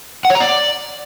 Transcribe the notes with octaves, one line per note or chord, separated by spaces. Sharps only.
F#5
C#5
A#5
D5